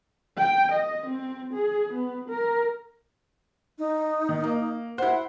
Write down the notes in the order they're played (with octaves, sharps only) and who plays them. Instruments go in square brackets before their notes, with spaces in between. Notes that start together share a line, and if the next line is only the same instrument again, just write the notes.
[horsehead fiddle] G5
D#5
C4
G#4
B3
A#4
[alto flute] D#4
[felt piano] D#3
A#3
[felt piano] E4 C5 [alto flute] F#5